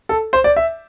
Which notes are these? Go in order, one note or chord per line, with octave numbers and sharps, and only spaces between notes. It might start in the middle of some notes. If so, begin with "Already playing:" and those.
A4
C5
D5
E5